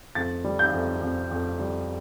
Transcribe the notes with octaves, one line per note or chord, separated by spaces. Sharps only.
F2 A6
G3
G6
F2
F2
F2
G3